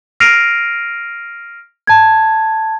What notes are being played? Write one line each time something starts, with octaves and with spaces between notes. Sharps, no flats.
F6 A#6 C7 D7 D#7 F7
A5 G#6